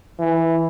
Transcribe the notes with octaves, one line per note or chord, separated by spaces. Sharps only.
E3